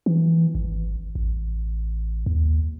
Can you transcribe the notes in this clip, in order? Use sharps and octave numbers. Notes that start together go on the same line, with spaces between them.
E3
G#1
A1
D#2